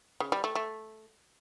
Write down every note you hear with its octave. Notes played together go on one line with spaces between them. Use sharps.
C#3
G3
A3
A3